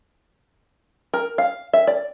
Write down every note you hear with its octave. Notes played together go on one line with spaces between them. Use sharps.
A#4
F5
E5
D5